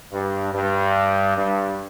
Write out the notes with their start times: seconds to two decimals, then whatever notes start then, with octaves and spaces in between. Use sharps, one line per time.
0.12 G2
0.53 G2
1.36 G2